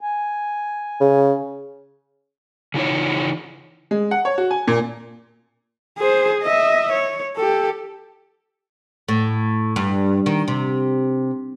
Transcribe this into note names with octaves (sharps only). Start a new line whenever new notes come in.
G#5
C#3
C#3 E3 D#4 F4 C#5
G#3
F#5
C#5
F#4
G#5
A#2
G#4 C5
D#5 E5
C#5
G4 A4
A2
G2
D#3
C3